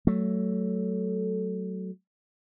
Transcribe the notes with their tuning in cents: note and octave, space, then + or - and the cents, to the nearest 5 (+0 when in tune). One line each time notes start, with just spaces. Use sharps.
F#3 +20 A3 +0